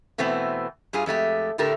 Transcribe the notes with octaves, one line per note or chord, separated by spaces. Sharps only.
B2 E3 A3 B3 C4
G2 G3 F4 G#4
F2 G#3 A3 G4
A2 D3 A3 G4 A4 A#4